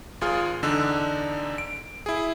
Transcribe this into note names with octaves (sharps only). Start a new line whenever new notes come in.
G#1 F4 G#4 F6
E2 D3 D4 D#4 E6
D7
E4 G#4